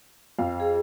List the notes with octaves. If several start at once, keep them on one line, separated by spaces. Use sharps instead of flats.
F2 F5
G#4